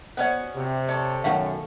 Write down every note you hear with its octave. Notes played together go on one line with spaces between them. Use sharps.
B3 C#4 F#4 C5 D5
C3
A4 C#5 D5
F#2 B2 D#3 A3 F5